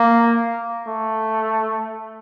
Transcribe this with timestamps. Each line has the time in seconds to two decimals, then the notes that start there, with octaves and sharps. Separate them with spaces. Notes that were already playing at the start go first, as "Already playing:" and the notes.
Already playing: A#3
0.88 A3